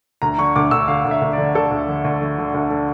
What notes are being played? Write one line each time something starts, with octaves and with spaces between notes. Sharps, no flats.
D2 A#5
D3 C#6
D2 D6
D2 E6
D3 F5
D2
E5
D2
D3 D5
D3 A4
D2
D3
D2
D3
D3
D2
D3